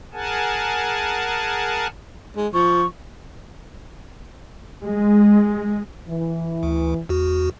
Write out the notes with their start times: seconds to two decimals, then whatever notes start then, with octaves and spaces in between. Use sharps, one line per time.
0.13 G#4 A#4 F#5 G#5 A5
2.36 G#3
2.54 F3 C#6
4.83 G#3
6.09 E3
6.63 D2
7.09 E2 F#4